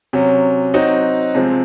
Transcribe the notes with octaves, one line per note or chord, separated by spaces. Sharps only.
C3 F#3 C#4
F#3 C4 D#4 F#4
C3 F3 G#3 C4